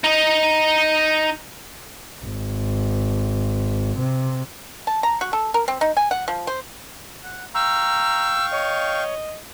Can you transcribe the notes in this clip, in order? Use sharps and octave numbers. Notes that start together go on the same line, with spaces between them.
D#4 D#5
G#1
C3
A5
A#5
F#4
A4
A#4
C4
D#4
G#5
F#5
F3
C5
F#5
F5 G5 A#5 C#6 E6
C#5 D#5